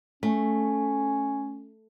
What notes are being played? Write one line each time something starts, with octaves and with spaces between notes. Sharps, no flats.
A3 C#4